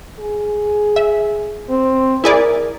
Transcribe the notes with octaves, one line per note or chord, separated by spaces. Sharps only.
G#4
E5
C4
E4 G#4 A#4 D5